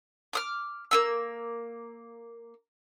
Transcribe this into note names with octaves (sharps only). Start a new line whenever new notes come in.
D6 D#6 F6
A#3 B3 E6